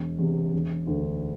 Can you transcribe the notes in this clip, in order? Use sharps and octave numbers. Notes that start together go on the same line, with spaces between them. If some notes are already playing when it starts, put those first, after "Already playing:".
Already playing: E1
E2 C3
E1
D2 D3